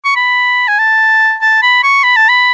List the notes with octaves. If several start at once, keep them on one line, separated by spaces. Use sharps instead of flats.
C#6
B5
G#5
A5
A5
B5
C#6
B5
A5
B5